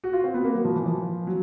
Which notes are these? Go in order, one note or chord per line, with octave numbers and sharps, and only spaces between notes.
F#4
F4
C4
B3
A#3
F#3
F3
E3
F3
F#3